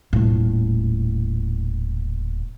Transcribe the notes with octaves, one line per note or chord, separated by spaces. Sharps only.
D#1 A2